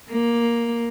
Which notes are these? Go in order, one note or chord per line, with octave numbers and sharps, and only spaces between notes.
A#3